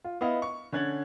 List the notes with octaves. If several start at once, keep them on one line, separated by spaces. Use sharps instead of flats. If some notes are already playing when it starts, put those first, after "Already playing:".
F4
B3 E4 D#5 F5
C#6
D3 C#4 F#6 G#6 A6 F#7